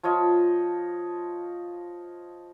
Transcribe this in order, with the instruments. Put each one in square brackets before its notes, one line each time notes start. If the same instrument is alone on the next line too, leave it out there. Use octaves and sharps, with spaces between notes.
[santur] F3 F4 C#5 D#5